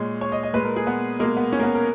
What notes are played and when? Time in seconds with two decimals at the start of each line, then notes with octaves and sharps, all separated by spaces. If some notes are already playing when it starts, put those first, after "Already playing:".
Already playing: A#2 G#3 C#5
0.21 C#5
0.32 D#5
0.43 D#5
0.53 A#2 G#3 B4
0.65 A#4
0.76 G#4
0.87 B3
1.20 B2 G#3 A#3
1.37 B3
1.53 C#4
1.59 A#3
1.63 B3
1.75 A#4